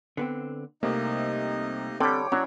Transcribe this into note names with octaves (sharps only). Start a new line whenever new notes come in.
D3 B3 C4
C2 C3 A3 A#3 D#4 D#5
D3 G3 C4 A4 C#5 G5 D6
F#3 C#4 D4 E4